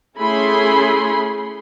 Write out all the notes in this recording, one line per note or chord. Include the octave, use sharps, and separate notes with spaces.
A3 C#4 E4 G#4 B5 C6